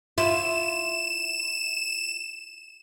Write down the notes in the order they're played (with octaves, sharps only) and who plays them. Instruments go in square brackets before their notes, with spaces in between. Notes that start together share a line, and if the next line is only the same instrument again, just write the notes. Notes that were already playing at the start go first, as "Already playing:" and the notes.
[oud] E4 F4 [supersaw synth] E7